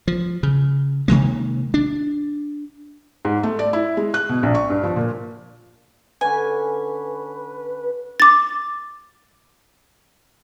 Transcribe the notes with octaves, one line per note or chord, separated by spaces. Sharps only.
F3
C#3
C3 D#3 G#3 A#3
D4
G#2
A3
D5
E4
G#3
F#6
B2
A#1
C#6
G2
F3
A#2
D3 C#4 B4 G#5
D6 A6